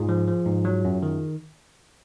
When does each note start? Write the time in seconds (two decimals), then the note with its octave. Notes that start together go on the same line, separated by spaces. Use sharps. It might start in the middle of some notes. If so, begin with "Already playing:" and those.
Already playing: G#2 F4 G#4
0.09 F3
0.28 F3
0.46 G#2
0.65 F#3
0.85 F#2
1.03 D#3